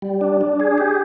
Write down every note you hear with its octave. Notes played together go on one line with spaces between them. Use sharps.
G3
D4
D4
G#4
G4